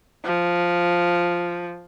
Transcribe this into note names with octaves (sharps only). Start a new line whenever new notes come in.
F3